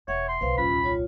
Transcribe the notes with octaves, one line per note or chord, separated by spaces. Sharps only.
E1 C#5 E5 F#5
C6
B1 C#3 B4 C5 F5
D#1 C2 C#4 F4 B5
F4 C#5